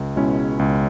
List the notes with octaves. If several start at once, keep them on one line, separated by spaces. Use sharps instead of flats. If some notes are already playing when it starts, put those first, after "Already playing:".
Already playing: C#2
B2 G#3 C#4 E4
C#2